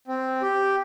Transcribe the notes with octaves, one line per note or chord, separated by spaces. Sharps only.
C4
G4